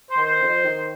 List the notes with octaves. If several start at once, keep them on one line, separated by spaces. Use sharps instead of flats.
C5
D#3
C5
F2
D#3